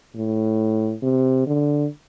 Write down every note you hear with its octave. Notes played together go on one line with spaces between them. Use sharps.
A2
C3
D3